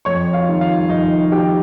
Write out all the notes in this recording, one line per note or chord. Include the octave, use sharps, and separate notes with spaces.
F2 C#5 C#6
F4 F5
D#3 G3
F4 F5
F2 D#4 D#5
D#3 G3 G4 G5